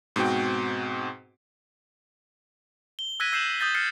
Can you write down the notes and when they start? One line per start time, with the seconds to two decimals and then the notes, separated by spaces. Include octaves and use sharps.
0.16 G#2 B2 C4 F#4 G5
2.99 G7
3.20 E6 F#6 G#6 A#6 B6 D#7
3.33 E6 G6 C7 D#7 E7 F#7
3.60 D#6 G6 A6 G7
3.75 F6 G6 A6 C7 C#7